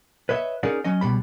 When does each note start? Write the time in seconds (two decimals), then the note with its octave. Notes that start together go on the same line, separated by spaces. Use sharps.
0.29 B4 C#5 D#5 E5
0.63 C#4 D#4 G#4 A#4 D5 F#5
0.84 F#3 C#4 D#5
1.01 C#2 B2 G3 B5